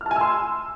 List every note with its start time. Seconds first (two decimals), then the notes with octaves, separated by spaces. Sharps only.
0.01 F6
0.06 A5
0.11 G#5
0.16 E6
0.21 C6